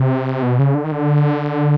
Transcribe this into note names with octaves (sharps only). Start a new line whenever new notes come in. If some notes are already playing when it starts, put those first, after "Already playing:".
Already playing: C3
B2
C#3
D3
D#3
D3